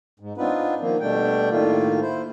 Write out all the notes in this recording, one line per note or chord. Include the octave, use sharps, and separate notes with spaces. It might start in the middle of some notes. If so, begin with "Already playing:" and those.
G#2
B3 C4 D4 D#4 F4 B4
D#3 F3 A#3
B2 G3 A3 D4 G5
A2 D#3 A3 A#3 F4
E4 C5